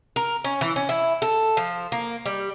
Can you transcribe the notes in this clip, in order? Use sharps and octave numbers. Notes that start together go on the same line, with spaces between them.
A#4
C#4
E3
C#4
E4
A4
F3
A#3
G3